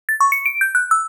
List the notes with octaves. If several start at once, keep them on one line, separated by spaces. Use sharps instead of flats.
A6
C#6
C#7
D7
G6
F#6
E6